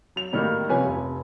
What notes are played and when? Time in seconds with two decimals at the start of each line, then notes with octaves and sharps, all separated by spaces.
0.16 F#3 F7
0.33 A2 D#3 G3 A#3
0.69 C3 F3 C#4 B4 G#5
0.85 F1